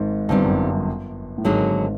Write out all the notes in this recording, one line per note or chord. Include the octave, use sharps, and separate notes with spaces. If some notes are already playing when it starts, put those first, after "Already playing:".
Already playing: G#1 G#2
G1 G2 G3 C4 D#4
F#2
A2
G#1 G#2 D3 F#3 A#3 D#4 G#4